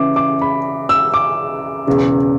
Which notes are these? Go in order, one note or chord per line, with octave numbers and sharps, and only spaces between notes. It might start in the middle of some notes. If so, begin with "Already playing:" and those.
Already playing: C#3 E3 D6
D6
B5
E6
D6
E1 E2 C#3